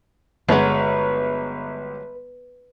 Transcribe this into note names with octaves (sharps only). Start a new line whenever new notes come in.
G1 F3 F#3 G#3 B4 C#5